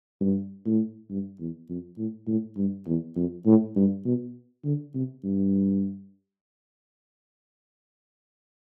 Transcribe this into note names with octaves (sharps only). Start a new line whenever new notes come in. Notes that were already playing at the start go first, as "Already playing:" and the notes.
G2
A2
G2
E2
F2
A2
A2
G2
E2
F2
A2
G2
B2
D3
C3
G2